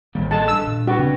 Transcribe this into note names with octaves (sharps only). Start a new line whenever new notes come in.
A1 A#2 D#3 G3
G#4 A4 D#5 A5
G2 E6
A#2
D4 F#4 G4 B4
C#3 C4